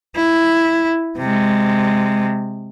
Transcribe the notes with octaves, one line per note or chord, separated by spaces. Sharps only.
E4
C3 G#3